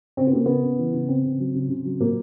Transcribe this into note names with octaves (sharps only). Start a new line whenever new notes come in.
C#3 C4
B3
C#3 A#3
C#3 B3
C#3
E3
C#3
C#3 C4
C#3
F#3
C#3
C#3
F#3
A#2 A#3